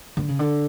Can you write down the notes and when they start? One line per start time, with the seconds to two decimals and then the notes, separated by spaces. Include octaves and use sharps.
0.17 D3
0.28 C#3
0.39 D3